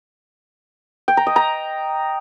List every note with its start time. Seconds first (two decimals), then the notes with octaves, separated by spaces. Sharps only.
1.08 G5
1.17 A#5
1.27 D#5
1.36 A#5